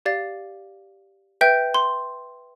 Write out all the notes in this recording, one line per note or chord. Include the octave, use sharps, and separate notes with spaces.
G4 D5 F5 A6
B4 E5 G5 G6
C6